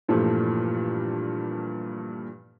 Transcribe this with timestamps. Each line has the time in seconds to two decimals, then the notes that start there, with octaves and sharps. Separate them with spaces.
0.08 G2 A#2 E3 F3 G3 A3